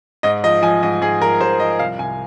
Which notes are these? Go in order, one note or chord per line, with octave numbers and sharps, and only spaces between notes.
G#2 D#5
F3 D#5
F3 G#5
G#2 D#5
G#2 G#4
F3 A#4
G#2 C5
F3 D#5
C2 F5
C2 G#5